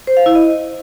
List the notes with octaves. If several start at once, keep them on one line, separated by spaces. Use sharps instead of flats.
C5
F5
E4
D#5